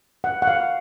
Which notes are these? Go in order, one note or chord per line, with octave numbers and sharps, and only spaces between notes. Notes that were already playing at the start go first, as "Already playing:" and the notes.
F#5
F#5
F5